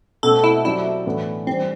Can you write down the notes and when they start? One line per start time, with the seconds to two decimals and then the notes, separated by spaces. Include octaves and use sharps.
0.23 B2 A3 C4 A4
0.44 E4
0.65 F#3 C4 E4 G4 D5
1.06 A2 E3 B3 D4
1.47 E3 G3 C4 D4